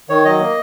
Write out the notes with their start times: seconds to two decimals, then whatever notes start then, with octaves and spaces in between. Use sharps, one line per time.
0.09 D#3 C#5
0.25 F#3 D#5
0.41 A#3